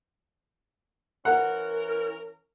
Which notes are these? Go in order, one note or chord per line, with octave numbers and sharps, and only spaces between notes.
E3 C#4 A#4 F#5